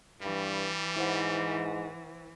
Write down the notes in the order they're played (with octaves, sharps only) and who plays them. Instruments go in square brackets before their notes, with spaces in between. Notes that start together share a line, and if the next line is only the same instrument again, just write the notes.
[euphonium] G2 [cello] E3 [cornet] G3
[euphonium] G#2 [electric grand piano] E4 C5 F#5